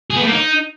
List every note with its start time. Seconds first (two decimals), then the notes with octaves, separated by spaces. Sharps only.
0.10 G#4
0.16 B3
0.21 A3
0.27 A#3
0.32 D#4